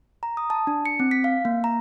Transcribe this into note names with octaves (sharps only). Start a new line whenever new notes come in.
A#5
D#6
A5
D4
C#7
C4
B6
F5
A#3
A#5